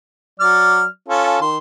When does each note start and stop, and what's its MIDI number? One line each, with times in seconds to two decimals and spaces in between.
0.40 0.85 54
0.40 0.85 74
0.40 0.85 89
1.09 1.39 61
1.09 1.39 65
1.09 1.39 69
1.41 1.58 51
1.41 1.58 84